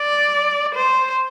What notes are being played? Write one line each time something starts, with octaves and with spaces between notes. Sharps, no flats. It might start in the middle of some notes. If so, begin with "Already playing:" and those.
Already playing: D5
C5